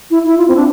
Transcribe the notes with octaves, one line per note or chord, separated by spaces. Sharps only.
E4
E4
F4
C4
D4